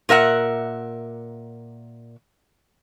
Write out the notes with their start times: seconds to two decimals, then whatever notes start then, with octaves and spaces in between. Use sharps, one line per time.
0.09 A#2 A#4 E5 F#5